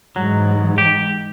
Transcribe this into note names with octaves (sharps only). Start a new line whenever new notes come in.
G#2 E3 F#3
G4